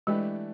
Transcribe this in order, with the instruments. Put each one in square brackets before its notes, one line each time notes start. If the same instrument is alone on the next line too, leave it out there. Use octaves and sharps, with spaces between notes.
[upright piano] E3 A3 D4 G4 B4 [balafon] G#3